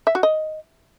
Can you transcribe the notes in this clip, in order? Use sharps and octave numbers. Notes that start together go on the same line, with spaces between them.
E5
F#4
D#5